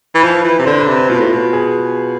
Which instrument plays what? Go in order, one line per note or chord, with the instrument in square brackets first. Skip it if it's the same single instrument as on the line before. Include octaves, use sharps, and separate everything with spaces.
[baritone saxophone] E3
[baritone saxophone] F3 [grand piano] B4
[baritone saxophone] E3
C3
[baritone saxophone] D3 [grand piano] C5
[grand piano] B4
[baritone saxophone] C3
[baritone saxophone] B2 [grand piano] F4
[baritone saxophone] A2
B2
[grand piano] G#4